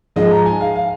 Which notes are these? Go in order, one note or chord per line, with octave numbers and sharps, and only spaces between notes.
G#2 F3 G#3 D#5
A#5
G#5
F5
F5